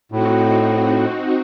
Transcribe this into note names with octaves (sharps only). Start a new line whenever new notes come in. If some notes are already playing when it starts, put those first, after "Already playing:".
A2 C4 D#4 F#4